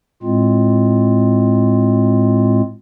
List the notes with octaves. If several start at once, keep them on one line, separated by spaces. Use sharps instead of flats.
A2 G#3 C4 F4